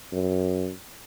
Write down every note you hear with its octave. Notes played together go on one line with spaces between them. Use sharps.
F#2